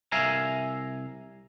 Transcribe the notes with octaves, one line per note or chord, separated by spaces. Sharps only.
C2 E5 F5 G#5 A#5